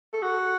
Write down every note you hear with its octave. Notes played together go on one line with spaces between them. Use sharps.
A4
F#4